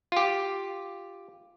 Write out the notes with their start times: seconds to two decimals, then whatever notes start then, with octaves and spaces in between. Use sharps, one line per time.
0.12 F4 G4